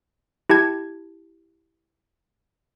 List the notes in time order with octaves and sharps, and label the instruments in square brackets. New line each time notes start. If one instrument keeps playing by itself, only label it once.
[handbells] E4 G4 A5 G#6